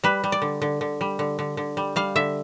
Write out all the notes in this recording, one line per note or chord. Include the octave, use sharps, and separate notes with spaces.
G3 B4
G3
D5
D3
D3
D3
G3
D3
D3
D3
G3
G3 F5
D3 E5